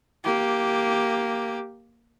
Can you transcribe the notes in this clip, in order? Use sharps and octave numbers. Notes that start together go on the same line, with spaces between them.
A#3 G4